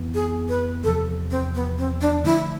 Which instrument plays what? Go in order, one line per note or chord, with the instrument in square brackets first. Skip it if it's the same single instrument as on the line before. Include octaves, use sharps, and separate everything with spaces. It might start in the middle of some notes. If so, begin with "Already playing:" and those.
Already playing: [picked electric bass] F2 E3 B3
[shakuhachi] G#4
B4
[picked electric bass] E2 [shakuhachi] A4
[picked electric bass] C3 F3
[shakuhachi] C4
B3
C4
D4
[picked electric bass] D3 F3 A3 [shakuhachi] E4